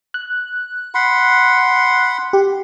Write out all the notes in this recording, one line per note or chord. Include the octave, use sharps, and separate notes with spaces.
F#6
F#5 B5 C6
G4